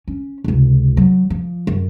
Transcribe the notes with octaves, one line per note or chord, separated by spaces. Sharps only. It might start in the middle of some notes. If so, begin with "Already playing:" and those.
C#4
F1 C#2
F#3
F3
F#2